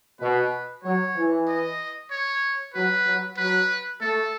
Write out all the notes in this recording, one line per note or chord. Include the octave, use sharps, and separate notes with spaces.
B2 B4
F#3 C#5
E3
D#5
C#5
F#3 B4
F#3
F#3 B4
A3 A4